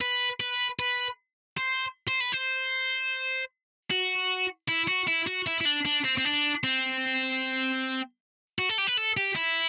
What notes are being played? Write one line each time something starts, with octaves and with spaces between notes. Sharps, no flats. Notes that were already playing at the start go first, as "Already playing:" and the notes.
B4
B4
B4
C5
C5
B4
C5
F#4
E4
F#4
E4
F#4
E4
E4
D4
D4
C4
C4
D4
C4
F#4
A4
G4
B4
A4
G4
E4